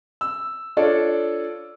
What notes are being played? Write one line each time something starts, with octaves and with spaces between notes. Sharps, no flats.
E6
D4 F4 A4 C#5 D5